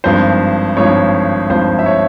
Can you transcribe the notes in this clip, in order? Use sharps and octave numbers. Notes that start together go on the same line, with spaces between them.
G#1 G2 F3 C5
G#1 G2 F3 C#5
G#1 G2 F3 C5
E5
C#5